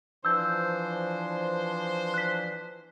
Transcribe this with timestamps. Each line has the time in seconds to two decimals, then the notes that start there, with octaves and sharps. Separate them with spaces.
0.25 E3 F3 D4 C5 E6 G6
2.14 F#6 B6